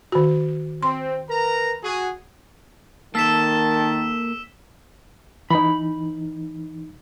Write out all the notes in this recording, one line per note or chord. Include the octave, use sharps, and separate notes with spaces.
D#3 F#4
C4 C6
A#4 B4 A#5
F#4 G#4
D#3 A#3 A4 A5 E6 B6 E7
E3 D#4 B5